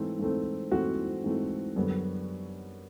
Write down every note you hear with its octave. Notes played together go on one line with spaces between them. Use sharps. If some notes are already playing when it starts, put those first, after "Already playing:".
Already playing: G#2 E3 A3 C4
G#2 E3 A3 C4
G#2 E3 A3 C4 F#4
G#2 E3 A3 C4
F#2 D3 G3 B3